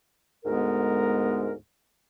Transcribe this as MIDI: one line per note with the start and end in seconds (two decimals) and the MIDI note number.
0.44 1.52 38
0.44 1.52 44
0.44 1.52 56
0.44 1.52 59
0.44 1.52 70